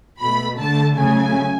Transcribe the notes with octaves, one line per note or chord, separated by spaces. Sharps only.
B2 A3 B5
D3 A3 A5
C#3 F#3 A3 G#5